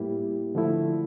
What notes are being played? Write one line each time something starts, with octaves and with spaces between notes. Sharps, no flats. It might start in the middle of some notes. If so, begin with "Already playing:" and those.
Already playing: A2 G3 A#3 E4 G4
D3 F3 A3 E4